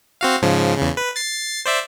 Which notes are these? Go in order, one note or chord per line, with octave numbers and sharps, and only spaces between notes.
C4 F#4 F5
G#2 C#3 F3
E2 C#3
B4
A6 C7
C5 D5 E5